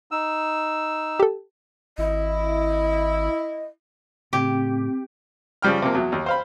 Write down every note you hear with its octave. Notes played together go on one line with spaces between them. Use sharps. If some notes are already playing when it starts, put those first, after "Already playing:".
D#4 E6
G4 A4
G#1 E4 D#5
A2 C#3 C4 G4
C#3 F3 G3 G5 F6
C3 F3 A#3
E2 F#3
D#2
C5 F5 B5